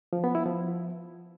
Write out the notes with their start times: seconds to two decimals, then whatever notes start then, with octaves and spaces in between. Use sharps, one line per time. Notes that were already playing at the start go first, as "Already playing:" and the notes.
0.13 F3
0.24 B3
0.35 E4
0.46 F3